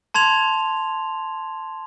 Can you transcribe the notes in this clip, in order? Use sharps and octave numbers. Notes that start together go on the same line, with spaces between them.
A5 C6 G#6 F7